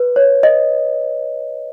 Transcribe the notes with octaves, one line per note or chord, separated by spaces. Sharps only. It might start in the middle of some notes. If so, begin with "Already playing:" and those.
Already playing: B4
C#5
D#5